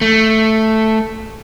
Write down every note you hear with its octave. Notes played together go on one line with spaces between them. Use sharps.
A3